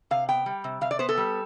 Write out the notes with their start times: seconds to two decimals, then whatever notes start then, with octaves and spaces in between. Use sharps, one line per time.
0.11 C3 F5
0.29 B3 G5
0.46 G3
0.64 C3
0.81 C3 F5
0.91 D5
0.99 B3 C5
1.09 A4
1.17 G3